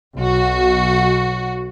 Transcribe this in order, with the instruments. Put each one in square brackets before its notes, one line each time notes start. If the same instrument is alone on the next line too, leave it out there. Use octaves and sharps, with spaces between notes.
[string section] B1 F#4